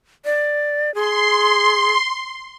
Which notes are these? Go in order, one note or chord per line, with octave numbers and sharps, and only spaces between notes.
D5
G#4 C6